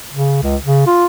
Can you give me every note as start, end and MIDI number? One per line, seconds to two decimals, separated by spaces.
0.13 0.38 49
0.43 0.56 37
0.64 0.84 49
0.87 1.06 65